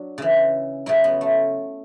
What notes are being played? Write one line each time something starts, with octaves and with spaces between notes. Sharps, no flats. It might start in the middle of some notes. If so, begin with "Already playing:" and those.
Already playing: F#3 D4
C#3 E3
C#3 F#3 E4
B3
A3